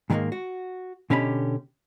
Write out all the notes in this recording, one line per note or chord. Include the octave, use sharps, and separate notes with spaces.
G#2 D#3 E3 G3 G#3 A#3
F#4
B2 D3 C#4 G4 D5 B5